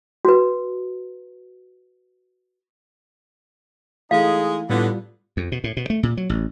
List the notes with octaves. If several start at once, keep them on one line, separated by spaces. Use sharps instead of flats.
F#4 B4
E3 G#3 A3 D#4 G#4 F5
A2 D3 G3 B3 F4
F2
B2
A2
B2
A3
A#2
F#3
A1